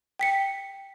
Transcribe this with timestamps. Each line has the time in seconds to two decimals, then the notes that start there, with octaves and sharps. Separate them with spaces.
0.19 G5 B6 C#7